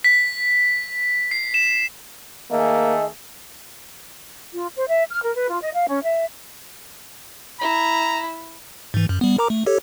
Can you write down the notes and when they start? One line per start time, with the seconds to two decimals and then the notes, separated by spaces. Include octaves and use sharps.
0.04 B6
1.31 C7
1.54 E7
2.51 D#3 A3 A#3 G#4 D#5
4.53 F4
4.75 C5
4.89 E5
5.09 F6
5.22 A#4
5.35 B4
5.49 F4
5.62 D#5
5.74 F5
5.89 C#4
6.03 E5
7.61 E4 A#5
8.94 G#2 E3
9.09 F#2
9.21 G3 B3
9.38 A#4 A#5 D6
9.50 A3
9.66 G4 A4 C#5